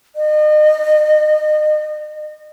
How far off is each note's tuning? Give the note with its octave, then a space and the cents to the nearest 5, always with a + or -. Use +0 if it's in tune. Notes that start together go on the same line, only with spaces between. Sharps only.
D#5 -35